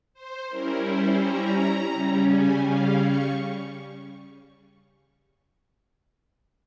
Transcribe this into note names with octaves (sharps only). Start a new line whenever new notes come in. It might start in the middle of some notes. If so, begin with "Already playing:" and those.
C5
G3 C#4 E4 A#4
C5
A#5
C#3 G3 C#4
G#5
F5
C#6